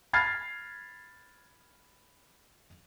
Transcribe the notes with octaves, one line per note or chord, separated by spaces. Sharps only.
B5 F6 G#6 A6 C7